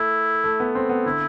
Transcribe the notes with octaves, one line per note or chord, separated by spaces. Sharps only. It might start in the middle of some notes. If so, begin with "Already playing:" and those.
Already playing: A3 E4
A3
B3
C4
B3
D3 E4